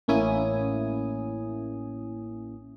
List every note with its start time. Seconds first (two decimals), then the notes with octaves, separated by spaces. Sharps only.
0.08 A1 A#3 C#4 E4 G#5 D#6